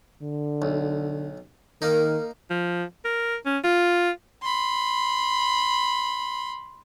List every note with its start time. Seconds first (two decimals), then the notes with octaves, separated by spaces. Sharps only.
0.22 D3
0.62 B1
1.82 D#3 A#3 D#4 A#4
2.50 F3
3.05 A#4
3.46 C#4
3.64 F4
4.43 B5 C6